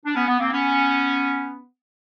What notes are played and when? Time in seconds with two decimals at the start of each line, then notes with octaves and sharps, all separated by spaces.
0.05 D4
0.15 B3 C#4
0.28 B3
0.40 A#3 C4
0.52 B3 C#4